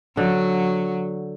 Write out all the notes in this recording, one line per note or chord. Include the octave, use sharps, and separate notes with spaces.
D3 F#3